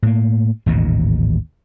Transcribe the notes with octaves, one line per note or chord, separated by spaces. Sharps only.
A2 A#3
A1 D#2 G#2 B2